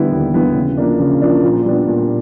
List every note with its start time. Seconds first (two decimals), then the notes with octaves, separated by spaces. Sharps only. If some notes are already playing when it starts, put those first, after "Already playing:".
Already playing: D3 G3 B3 E4
0.11 D#2
0.33 D3 G3 B3 E4
0.55 C#3
0.77 F3 A#3 D4
1.00 C#3
1.22 F3 A#3 D4
1.44 A#2
1.66 G3 B3 D4
1.88 A#2